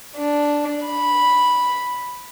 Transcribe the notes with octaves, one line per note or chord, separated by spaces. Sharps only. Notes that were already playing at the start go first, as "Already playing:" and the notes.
D4
B5